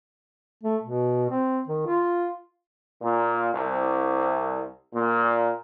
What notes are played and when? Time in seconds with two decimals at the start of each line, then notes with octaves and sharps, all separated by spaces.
0.63 A3
0.83 B2
1.30 C4
1.67 D#3
1.87 F4
3.02 A#2
3.54 C2
4.94 A#2